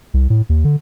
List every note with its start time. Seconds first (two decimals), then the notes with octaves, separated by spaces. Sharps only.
0.14 C2
0.30 A2
0.49 D#2
0.65 D3